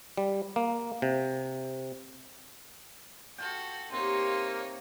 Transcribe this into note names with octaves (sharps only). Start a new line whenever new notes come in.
G3
A#3
C3
F4 F#4 A4 G5
C3 A#3 D#4 C#5 C6